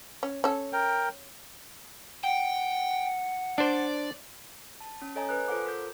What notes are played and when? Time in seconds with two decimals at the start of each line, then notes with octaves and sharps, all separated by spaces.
0.23 C#4
0.44 C#4 A4
0.73 A#4 G5
2.24 F#5 G5
3.58 D4 C5 D5
4.81 A5
5.02 C#4
5.16 A4 C#5 D#5 G#5 A#5
5.29 B4 G#5 F#6
5.48 F4 A4 C5 F#5 D6
5.66 A#4 G6